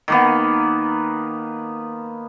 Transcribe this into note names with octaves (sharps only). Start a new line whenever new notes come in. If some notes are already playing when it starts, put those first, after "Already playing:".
D#3 A#3 B3